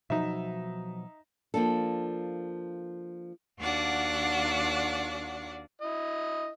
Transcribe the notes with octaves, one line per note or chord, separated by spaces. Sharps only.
B2 F3 F#3 D#4 E5
F3 A#3 D4 A4
D#2 D4 F#4 D5 F5 F#5
E4 D#5